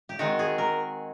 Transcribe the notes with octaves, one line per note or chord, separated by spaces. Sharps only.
G4
D#3 G#3 C4 F#4
G#4
A#4